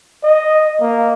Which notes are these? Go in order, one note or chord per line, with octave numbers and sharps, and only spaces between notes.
D#5
A#3